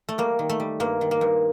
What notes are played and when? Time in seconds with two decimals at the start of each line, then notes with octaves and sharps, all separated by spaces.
0.09 A3
0.18 G3 A#3
0.39 D#3
0.49 A3
0.60 G3
0.80 G2 A#3
1.01 D#3
1.11 A#3
1.21 G2